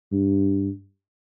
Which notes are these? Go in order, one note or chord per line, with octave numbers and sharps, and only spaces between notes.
G2